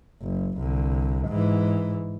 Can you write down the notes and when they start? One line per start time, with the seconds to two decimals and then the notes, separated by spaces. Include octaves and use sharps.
0.23 F#1
0.58 C2 D3
1.28 G#2 E3